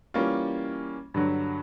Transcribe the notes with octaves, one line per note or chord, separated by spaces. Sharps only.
E3 G3 A#3 C#4 F4
G2 D3 F#3